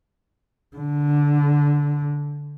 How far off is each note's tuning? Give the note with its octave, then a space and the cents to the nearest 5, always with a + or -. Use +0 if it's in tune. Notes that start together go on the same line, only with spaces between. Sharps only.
D3 -10